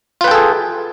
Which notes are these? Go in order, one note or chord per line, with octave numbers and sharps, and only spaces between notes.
F4 G#4 A4 B4 G5